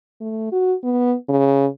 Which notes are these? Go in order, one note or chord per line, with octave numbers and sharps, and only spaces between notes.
A3
F#4
B3
C#3